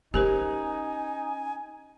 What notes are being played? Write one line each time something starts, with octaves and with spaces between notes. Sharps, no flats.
C#4 D#4 G4 A#4 C5 G#5